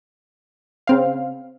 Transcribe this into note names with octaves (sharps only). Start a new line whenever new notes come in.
C#3 C4 F5